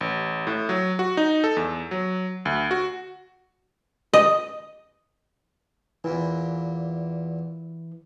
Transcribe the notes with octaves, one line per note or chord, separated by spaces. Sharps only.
A1
A2
F#3
F#4
D#4
A4
E2
F#3
D2
F#4
D#5
E2 A#2 E3